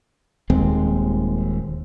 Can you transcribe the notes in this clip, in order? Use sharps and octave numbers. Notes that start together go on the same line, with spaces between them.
D#1 D#2 G#3 C4